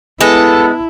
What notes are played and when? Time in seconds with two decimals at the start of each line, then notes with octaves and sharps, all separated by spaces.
0.21 G#3 B3 E4 A4